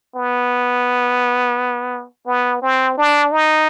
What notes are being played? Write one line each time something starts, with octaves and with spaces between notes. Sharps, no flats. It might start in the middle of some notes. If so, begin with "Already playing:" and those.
B3
B3
C4
D4
D#4